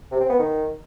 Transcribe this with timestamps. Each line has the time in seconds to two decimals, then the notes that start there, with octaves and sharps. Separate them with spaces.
0.11 C3
0.21 C4
0.30 B3
0.39 D#3